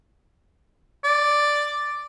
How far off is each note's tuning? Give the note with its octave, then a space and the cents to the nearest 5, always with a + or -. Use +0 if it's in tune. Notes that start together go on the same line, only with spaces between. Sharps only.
D5 +0